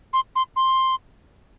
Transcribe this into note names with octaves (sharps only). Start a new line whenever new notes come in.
C6
C6
C6